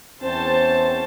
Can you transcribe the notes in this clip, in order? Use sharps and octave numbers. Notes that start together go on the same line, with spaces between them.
E2 C4 C#4 C5 A5